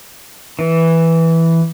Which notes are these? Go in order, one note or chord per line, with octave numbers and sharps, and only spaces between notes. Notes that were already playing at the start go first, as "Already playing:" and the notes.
E3